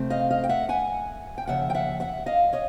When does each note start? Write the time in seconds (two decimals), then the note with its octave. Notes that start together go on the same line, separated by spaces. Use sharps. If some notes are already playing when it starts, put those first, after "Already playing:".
Already playing: C3 A3 C4
0.10 D#5 F5
0.30 D#5 F5
0.44 G5
0.49 E5 F#5
0.69 F#5 G#5
1.38 G5
1.47 D#2 C#3 F3 E5 F#5
1.70 G5
1.74 E5 F#5
2.00 E5 F#5
2.26 D#5 F5
2.53 C#5 D#5